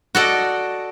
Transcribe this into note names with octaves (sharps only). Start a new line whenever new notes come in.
F#4 A4 D5 D#5